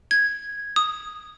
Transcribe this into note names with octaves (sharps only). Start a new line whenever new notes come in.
G#6
D#6